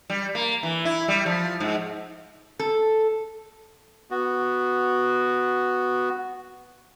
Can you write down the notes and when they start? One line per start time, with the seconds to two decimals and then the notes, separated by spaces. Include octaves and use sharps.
0.10 G3
0.35 A#3
0.63 E3
0.85 E4
1.08 G3
1.26 F3
1.60 G#2
2.59 A4
4.11 B3 F#4